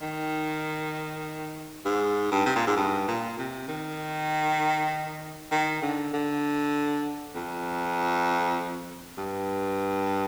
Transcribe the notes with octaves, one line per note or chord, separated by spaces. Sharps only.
D#3
G#2
G2
C3
A#2
G#2
G2
A#2
C3
D#3
D#3
D3
D3
F2
G2